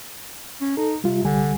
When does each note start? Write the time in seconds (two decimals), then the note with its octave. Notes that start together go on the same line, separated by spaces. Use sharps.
0.61 C#4
0.77 D#4 A4
1.04 C3 G3 F4
1.24 C2 D3 G3 G#5